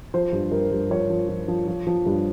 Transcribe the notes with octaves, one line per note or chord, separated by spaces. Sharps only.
F3 C5
G2
G2 A#4
G2
F3 C#5
F3
F3
F3
F3
F3
G2